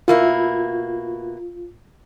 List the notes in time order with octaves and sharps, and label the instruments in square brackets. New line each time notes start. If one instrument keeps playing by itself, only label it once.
[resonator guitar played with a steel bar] B2 A#3 E4 [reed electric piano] F4